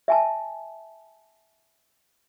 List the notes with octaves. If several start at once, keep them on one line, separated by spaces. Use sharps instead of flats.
E5 G#5 A5